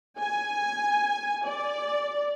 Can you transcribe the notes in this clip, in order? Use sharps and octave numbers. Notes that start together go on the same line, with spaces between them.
G#5
D5